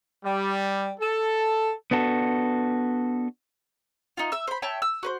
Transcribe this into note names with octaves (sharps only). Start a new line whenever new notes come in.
G3
A4
B3 D4 F#4 A4
D#4 F4
E5 E6
C5 B5
C#5 E5 G5 A5
E6
F#4 B4 C5